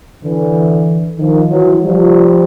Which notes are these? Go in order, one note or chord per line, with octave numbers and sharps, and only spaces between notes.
D3 E3
D#3 F3
E3 F#3
F3 G3